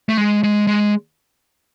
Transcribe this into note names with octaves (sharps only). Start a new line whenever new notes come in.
A3
G#3
G#3
G#3